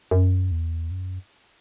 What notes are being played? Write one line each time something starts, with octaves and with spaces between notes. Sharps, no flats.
F#2
E2
F#2